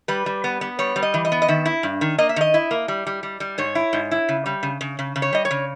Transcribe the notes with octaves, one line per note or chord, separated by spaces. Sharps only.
G3 B4
G3
B3
B3
G3 C#5
G3
D#5
E3
D#5
B3
D#5
D#3 E5
E4
G2
D#3
A#3 D#5
E5
D#3 D#5
E4
A#3
G3
G3
G3
G3
G#2 C#5
E4
G#2
E4
C#3
G3
C#3
C#3
C#3
C#3
C#5
G3 D#5
C#5
C#3